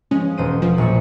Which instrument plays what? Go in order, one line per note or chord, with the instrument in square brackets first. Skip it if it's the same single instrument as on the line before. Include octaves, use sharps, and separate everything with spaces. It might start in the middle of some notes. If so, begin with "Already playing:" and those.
[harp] F3 G#3 [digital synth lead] C#4
[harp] E1 C5 D#7
[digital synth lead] F3
[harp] A#1 F#3 C#6